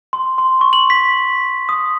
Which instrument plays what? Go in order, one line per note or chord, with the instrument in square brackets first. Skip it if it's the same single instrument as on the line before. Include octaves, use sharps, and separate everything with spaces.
[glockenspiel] C6
C6
C#6
F#7
B6
D#6